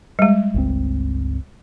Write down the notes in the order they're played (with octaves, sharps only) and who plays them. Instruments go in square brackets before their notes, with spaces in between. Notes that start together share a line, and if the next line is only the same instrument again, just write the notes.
[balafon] G3 G#3
[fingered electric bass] G1 C#2 C4